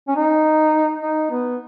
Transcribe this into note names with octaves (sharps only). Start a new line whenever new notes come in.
C#4
D#4
D#4
B3